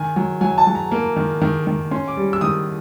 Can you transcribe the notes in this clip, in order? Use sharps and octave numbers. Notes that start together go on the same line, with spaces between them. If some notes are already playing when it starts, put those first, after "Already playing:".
Already playing: D#3 G#5
F#3
F#3 G#5
A5
F#3
A#5
A#3
D#3
D#3
D#3
C#4 C6
D6
G3
E6
D#3 D#6